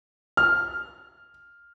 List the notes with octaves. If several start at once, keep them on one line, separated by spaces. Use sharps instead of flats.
F6